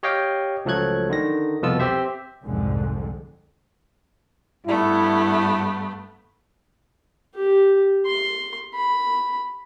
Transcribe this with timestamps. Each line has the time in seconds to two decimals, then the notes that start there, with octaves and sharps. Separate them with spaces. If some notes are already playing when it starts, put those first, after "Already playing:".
0.03 G4 C#5 D#5 F5 G5
0.65 C#2 F3 F#3 A3 F#6 G#6
1.10 D3 D#3 A#6
1.62 C2 F2 B2 B3 F4 E6
1.80 C4 G4 C5 E5
2.44 C2 F2 G#2 D3 G#3
4.67 G2 A3 B3 E4
7.35 G4
8.06 C6
8.75 B5